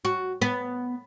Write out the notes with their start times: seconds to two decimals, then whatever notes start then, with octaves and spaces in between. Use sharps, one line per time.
0.05 F#4
0.42 B3